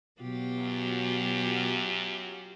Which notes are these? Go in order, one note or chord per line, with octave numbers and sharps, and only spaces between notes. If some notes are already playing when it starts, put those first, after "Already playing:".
B2 F#3 F4 G4
F#2